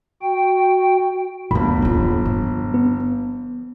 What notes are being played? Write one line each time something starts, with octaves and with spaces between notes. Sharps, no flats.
F#4 G5
G1 D#2 A3 B5
D#1 F4
F3
B3